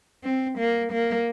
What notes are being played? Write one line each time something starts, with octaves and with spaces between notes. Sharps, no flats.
C4
A#3
A#3